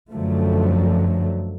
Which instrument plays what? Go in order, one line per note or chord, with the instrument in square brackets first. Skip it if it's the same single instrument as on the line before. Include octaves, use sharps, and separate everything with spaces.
[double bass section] F#2 D3 F3 F#3 A3